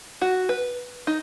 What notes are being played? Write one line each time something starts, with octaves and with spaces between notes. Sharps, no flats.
F#4
B4
D#4